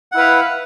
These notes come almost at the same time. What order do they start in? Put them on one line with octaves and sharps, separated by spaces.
F#5 E4 B4 F5